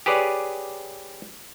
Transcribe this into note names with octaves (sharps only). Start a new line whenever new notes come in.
G4 G#4 B4 C#5 D5